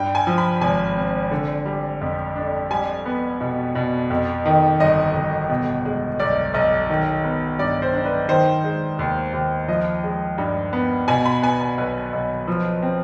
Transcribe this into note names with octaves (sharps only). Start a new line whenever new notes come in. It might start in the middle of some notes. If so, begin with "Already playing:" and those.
Already playing: G2 G5
G#5
F3
B5
G#1 G#5
C4
D3
G3
F2
D4
G3 G#5
B3
B2
B2
F2
D#3
G1 D#5
G1
B2
G#3
B1 D5
B1 D#5
D#3
B3
G2 D5
C5
D4
B4
D#3 C5
G#3
D#2
D#2
F3 D#5
G#3
G2
B3
B2 G#5
B5
B3 G#5
G#5
B1 B4
B1
F3
C4